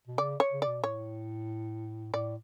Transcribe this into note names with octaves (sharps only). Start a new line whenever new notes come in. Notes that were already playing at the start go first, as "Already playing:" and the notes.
B2
C#3 D5
C#5
C#3
D5
B2
A2 C#5
A2 D5